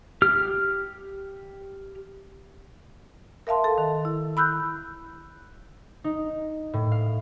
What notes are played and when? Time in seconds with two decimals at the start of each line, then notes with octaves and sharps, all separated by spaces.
0.22 G4 F6
3.47 A#4 E5 F5 A5 C6
3.64 A4
3.78 D#3
4.05 E4
4.37 B5 E6 F#6 G6
6.04 D#4
6.73 A2
6.92 F5